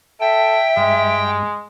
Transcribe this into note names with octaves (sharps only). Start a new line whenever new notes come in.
A4 E5 G5
G2 G#3